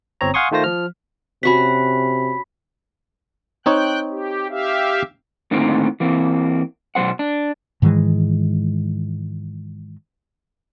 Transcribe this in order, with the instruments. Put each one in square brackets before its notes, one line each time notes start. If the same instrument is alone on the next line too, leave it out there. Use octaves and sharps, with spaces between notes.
[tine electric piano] G1 C4 C#5 A#5
F5 F#5 G#5 C6 C#6 D#6
D#3 A3 F4 C5 A#6
F3 F6
[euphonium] C3 [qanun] C#4 F#4 F#5 [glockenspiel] B5 B6
[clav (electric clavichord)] C4 D#4 C#5 [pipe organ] G5 F#6
[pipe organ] G4
G4 E5 F5
[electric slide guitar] A2 D3 D#3 A#3 C4
E3 A#3 C4
B2 F#3 G#3 C5 F#5
D4
[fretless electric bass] G#2 D#3 E3 G#3